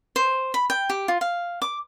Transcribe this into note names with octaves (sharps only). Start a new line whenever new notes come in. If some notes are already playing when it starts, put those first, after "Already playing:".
C5
B5
G5
G4
F4
F5
D6